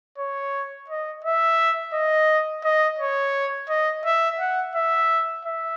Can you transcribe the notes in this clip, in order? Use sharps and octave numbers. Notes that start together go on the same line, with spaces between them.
C#5
D#5
E5
D#5
D#5
C#5
D#5
E5
F#5
E5
E5